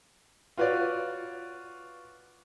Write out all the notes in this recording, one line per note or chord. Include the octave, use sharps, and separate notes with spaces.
F4 F#4 B4 C#5 D5